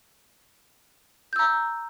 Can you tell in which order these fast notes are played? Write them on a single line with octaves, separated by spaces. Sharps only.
G6 E6 A#5